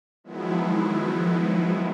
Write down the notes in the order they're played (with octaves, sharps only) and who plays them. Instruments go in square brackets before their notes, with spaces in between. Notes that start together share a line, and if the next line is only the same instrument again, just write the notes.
[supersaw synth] D#3 F3 F#3 G#3 B3 E4